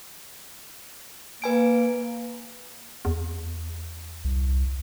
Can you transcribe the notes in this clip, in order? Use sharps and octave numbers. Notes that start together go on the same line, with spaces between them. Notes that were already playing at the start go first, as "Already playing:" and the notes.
A#3 B4 G#5 D7
E2
C2